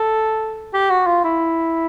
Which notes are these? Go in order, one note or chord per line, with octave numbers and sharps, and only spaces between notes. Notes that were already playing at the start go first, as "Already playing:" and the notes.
Already playing: A4
G4
F#4
F4
E4